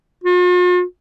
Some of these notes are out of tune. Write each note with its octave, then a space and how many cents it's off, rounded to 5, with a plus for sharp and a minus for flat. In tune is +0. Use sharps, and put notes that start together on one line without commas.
F4 +45